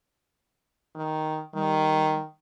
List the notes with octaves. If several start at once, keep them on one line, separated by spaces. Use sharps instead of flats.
D#3
D#3 G3